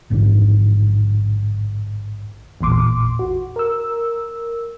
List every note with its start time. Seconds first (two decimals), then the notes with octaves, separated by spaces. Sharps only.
0.10 A1 F2 G#2 D3
2.61 A1 E2 A#2 C6 D6
3.19 F#4
3.56 A#4 E6